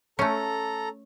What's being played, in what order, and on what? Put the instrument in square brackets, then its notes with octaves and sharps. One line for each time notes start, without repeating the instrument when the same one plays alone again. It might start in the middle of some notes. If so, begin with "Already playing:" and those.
[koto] A3 C#4 [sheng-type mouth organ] A4 A#5